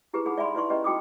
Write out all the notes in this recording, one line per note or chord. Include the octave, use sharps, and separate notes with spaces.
D#4 E4 G4 G#4 B4
D#4 G#4 A4 F#5 B5
D5 E5 G#5 B5 C6
D#4 E4 B4 D5 C6 C#6
C#4 E4 G4 B4 D5 D#5
D#4 F#4 G5 B5 D6 D#6